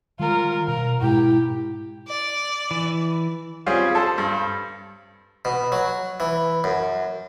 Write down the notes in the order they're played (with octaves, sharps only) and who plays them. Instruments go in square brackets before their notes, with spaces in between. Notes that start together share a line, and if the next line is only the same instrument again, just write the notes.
[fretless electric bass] D#3 G3 G#3 [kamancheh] F4 A#4
[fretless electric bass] B2 [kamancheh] A#4
[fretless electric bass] G#2 B2 G#3 [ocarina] E4 [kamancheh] G4
[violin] D5
[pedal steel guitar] E3
[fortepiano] G3 C4 C#4 F4 G#4
A4 C5 A5
G2
[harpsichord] B2
F#3
E3
F#2